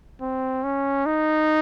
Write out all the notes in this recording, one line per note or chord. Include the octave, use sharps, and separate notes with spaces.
C4
C#4
D#4